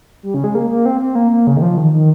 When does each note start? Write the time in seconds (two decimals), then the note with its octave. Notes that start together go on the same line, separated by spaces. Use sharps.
0.23 G3
0.34 C#3
0.44 G#3
0.55 A#3
0.70 A#3
0.86 C4
1.01 C4
1.15 A#3
1.31 A#3
1.47 C#3
1.57 D#3
1.62 F3
1.77 D#3
1.93 D#3